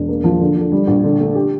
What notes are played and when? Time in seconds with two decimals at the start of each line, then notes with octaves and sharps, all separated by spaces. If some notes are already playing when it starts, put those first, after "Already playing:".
Already playing: E1
0.08 A#3
0.24 F3
0.41 D3
0.57 D3
0.72 G3
0.87 A#1
1.04 D3
1.20 A3
1.35 G4